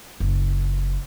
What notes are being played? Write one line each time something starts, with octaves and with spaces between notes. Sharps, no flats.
F#1